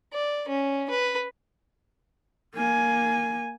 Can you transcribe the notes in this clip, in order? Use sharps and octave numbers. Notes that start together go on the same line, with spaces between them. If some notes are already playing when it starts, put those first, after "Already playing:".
D5
C#4
B4
A#3 G#5